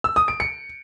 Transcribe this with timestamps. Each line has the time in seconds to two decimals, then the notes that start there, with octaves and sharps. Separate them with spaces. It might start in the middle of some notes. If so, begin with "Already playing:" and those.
0.04 E6
0.16 D#6
0.28 D7
0.40 C#7